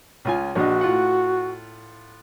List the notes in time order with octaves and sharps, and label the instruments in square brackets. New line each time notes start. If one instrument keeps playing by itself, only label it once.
[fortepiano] C#2 F4 G#5
[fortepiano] A#1 D4 D#5 [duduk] F#4
[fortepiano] A2 F4 F#5